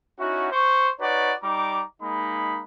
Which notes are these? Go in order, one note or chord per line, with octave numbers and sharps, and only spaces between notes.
C#4 D#4 E4 F#4
C5 C#6
D#4 F#4 B4 C#5 D5
G3 D#4 A#5 D6
G#3 A#3 D#4 B5